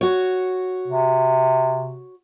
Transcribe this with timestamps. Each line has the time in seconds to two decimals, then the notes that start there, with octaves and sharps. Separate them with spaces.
0.01 F#4 C#5
0.88 C3